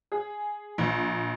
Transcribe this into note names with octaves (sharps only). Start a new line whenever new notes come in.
G#4
A#1